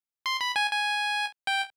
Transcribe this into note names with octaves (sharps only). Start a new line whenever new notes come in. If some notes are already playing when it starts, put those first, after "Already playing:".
C6
B5
G#5
G#5
G5